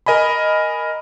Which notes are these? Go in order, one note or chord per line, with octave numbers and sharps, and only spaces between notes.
A#4 D#5 G#5 B5